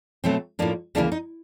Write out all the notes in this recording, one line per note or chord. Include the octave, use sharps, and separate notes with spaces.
B2 F#3 A3 C4
A2 F3 A#3 D4
D2 C#3 E3 G3 A#3 D4
D#4